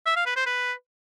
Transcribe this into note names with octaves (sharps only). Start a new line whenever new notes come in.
E5
F5
B4
C5
B4